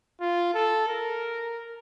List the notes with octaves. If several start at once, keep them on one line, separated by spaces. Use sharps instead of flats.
F4
A4
A#4